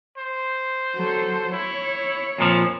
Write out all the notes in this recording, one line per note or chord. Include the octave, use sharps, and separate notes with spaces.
C5
F#3 A4
E4 C#5
F2 A#2 F3